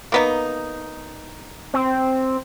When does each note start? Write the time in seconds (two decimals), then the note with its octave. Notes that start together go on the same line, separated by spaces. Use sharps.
0.12 A#3 B3 D#4
1.74 C4